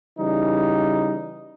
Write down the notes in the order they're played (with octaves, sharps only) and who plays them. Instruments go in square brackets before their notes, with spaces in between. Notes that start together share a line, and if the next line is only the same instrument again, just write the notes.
[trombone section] C#3 E3 G3 D#4